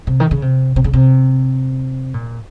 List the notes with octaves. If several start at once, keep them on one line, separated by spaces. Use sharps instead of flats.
C3
D#3
C#3
C3
C3
C#3
C3
A#2